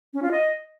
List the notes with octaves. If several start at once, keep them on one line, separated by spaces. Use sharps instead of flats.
C#4
F4
D#5